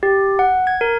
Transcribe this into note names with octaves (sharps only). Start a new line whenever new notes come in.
G4
F#5
G#6
A#4